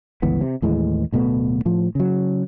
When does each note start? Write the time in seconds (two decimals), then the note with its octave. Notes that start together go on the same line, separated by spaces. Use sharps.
0.22 G1 C#2 E3 B3
0.41 C3
0.62 D#2 A2 E3 G#3
1.12 D1 B2 A3 B3
1.65 A2 F3
1.95 C#3 F#3